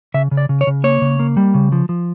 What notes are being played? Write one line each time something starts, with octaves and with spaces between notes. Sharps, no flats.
C#3 E5
C#3
D5
C#3
C#5
C#3
A#3 C#5
C#3
A#3
G3
C#3
F3
F3